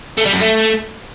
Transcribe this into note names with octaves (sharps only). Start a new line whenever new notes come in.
A3
G3
F#2
A3